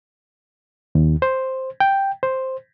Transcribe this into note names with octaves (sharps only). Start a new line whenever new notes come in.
D#2
C5
G5
C5